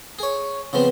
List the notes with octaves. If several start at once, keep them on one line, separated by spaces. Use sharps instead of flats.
G#4 C#5
C#3 F3 B3 C4